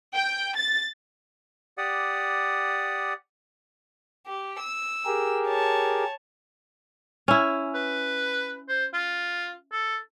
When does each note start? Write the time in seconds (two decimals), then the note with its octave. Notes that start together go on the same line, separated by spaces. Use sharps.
0.15 G5
0.57 A6
1.78 G4 D5 F#5 D#6
4.26 G4
4.59 E6
5.06 G4 G#4 A#4
5.47 C#5 A5
7.28 C#4 E4
7.74 B4
8.69 C5
8.94 F4
9.72 A4